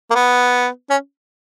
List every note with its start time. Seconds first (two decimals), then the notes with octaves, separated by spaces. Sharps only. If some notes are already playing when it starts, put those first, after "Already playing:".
0.11 A#3
0.15 B3
0.90 C#4